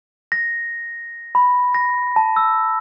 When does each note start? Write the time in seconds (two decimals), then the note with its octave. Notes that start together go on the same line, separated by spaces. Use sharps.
0.32 A#6
1.35 B5
1.74 A#6
2.16 A5
2.36 E6